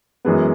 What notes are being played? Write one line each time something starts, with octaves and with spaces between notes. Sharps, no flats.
F#2 E3 G#3 B3